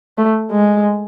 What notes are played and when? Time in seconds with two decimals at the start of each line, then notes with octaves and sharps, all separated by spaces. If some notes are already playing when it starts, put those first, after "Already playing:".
0.18 A3
0.51 G#3